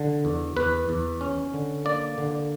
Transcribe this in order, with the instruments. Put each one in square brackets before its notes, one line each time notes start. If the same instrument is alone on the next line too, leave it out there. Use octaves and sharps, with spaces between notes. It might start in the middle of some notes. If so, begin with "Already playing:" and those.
Already playing: [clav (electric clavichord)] D3
E2
E2 B4
E2
C#4
D3
A#3 D5
D3